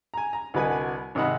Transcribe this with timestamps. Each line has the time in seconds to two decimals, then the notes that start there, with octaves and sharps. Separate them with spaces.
0.14 G#5 A#5
0.33 A#5
0.54 C2 D3 F#4 B4 D#5 G#5
1.15 G#1 C3 D#3 D#5 F#5 B5